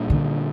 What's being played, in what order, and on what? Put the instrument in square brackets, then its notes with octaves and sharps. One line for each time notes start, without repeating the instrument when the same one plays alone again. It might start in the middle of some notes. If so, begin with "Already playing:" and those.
Already playing: [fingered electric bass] A#2 G3 A#3 D4
[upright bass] D3